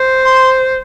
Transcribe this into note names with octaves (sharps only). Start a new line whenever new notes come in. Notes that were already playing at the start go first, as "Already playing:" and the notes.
Already playing: C5
C6